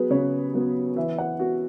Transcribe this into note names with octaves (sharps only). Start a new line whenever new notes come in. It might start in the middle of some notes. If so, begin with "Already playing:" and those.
Already playing: F#3 B3 G#4 B4
C#3 C#5
F#3 B3
E3 E5
F#5
B3 F#4